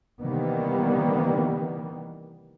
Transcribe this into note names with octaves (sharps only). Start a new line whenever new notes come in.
C3 D#3 E3 G3 A#3 B3